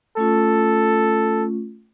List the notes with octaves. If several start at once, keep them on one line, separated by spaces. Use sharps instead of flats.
A3 C#4 F4 A4